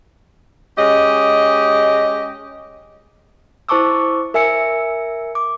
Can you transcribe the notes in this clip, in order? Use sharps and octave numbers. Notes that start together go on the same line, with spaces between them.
G#3 C#4 G4 D#5
E4 C5 A5 C#6 D6 E6
A#4 E5 G#5 E6 C#7
D6